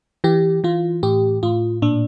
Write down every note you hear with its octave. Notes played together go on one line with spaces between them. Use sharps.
E3 G4
E3 F4
A2 G4
A2 F4
A#2 D4